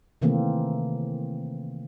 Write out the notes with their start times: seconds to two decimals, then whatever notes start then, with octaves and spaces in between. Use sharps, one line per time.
0.22 C3 D#3 E3 A3 A#3 C4